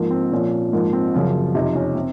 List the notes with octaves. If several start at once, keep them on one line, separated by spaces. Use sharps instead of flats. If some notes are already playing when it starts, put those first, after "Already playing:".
Already playing: G#2 F3 A#3
C4
A#2 F3 C#4
G#2 F3 A#3
C4
F#2 C#3 F3 F4
F2 C3 F3 D#4
C#4
C4